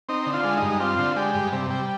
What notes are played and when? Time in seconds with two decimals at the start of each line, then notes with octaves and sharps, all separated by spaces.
0.09 C4 D#4
0.27 D3
0.33 F4
0.44 G#3
0.57 G2 D#4
0.80 C4 F4
0.99 D3
1.16 G#3 G4
1.34 G2
1.52 C3
1.70 G3